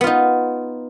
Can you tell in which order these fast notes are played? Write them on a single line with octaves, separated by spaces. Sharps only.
B3 F4 D#4